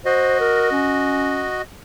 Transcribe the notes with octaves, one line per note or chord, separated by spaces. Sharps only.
F#4 C5 D#5
A#4
C#4